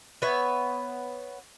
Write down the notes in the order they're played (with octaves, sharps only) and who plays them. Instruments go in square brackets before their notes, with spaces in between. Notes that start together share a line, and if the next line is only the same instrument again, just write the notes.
[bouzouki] B3 B4 C#5 E5